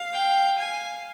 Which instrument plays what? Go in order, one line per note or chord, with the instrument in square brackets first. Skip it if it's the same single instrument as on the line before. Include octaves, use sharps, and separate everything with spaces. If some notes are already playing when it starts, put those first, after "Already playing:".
Already playing: [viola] F5
[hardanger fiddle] G5
[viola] F5 [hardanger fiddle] G#5